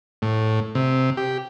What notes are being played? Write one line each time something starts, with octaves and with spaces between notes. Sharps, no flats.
A2
C3
G4